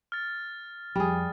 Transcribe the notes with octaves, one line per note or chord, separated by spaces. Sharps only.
F6 A6
F2 G3 G#4